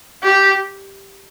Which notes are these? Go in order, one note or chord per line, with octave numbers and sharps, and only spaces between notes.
G4